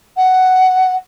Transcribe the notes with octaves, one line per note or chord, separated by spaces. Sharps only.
F#5